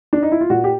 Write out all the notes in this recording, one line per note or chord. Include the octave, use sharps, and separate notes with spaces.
D4
D#4
E4
F4
A#2 F#4
G4